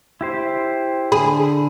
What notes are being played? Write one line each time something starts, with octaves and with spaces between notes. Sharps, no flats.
E4 G4 C5
D3 G#4 B5